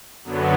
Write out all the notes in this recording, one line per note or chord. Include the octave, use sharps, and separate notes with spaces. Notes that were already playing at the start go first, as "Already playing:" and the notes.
F#2 D3 F#3 B3